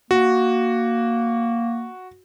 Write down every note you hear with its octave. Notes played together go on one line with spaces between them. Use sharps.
A#3 F#4